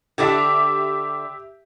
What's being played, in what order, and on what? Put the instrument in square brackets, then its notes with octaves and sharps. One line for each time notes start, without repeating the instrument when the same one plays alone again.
[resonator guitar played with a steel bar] D3 D4 D5 [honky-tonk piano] G4 E5